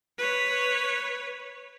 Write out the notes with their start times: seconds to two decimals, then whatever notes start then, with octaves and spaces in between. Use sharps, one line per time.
0.18 B4 C#5